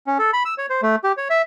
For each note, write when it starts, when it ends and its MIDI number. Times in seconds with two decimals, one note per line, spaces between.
0.07 0.18 61
0.19 0.31 69
0.33 0.43 83
0.45 0.54 88
0.58 0.66 73
0.70 0.81 72
0.82 0.96 57
1.04 1.12 67
1.17 1.28 73
1.30 1.42 76